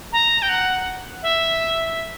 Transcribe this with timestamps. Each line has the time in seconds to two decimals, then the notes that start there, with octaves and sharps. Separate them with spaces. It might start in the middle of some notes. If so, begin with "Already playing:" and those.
0.13 A#5
0.42 G5
0.49 F#5
1.23 E5